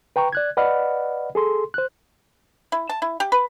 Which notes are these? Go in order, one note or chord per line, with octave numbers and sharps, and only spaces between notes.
B4 G5 A#5 C#6
D5 F#6 G#6
B4 D5 D#5 F#5 B5 F6
G#4 A4 C6
C5 F#6
E4
A5
E4
G4
B4